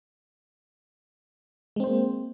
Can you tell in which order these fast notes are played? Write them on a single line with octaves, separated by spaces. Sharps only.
G#3 C4 C5 A#3